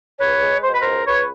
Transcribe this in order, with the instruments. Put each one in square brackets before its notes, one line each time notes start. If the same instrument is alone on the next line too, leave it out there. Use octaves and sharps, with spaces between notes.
[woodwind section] C#2 B4 C#5
G#3
B2 C5
B4
C#2 A#4 C5
C#2 B4 C#5